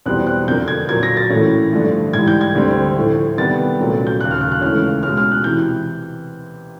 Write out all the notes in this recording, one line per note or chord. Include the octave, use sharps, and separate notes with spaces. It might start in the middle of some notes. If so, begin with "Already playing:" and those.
E2 B2 G3 C4 F#6
F#6
F2 D3 F3 A#3 G6
G#6
A#2 F#3 A#3 G#6
A#6
A6
A2 E3 A3 C#4
G2 D3 F3 A3
G#2 E3 G3 G#6
G6
G#6
D2 D3 G3 C4
A2 F3 A3
C3 D#3 G3 B3 A6
C2 A#2 F#3 A3 C#4
G6
D#2 C#3 F#3 F#6
F6
F#6
F#6
C#2 C#3 E3 A3 C#4 F6
B2 G#3 C#4 F6
F6
F#6
C3 E3 G6